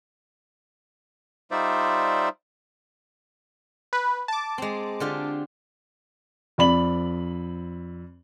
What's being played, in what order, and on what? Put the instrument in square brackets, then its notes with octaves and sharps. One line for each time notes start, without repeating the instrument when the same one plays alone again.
[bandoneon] G3 D#4 F4 C5 D5 E5
[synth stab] B4
A5 D6
[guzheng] G#3 C4
D3 F4 G4
[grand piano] F2 D5 B5 F#7